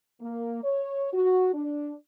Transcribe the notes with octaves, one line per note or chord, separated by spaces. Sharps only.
A#3
C#5
F#4
D4